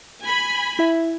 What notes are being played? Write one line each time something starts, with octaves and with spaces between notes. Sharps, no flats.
G#5 B5
E4 E5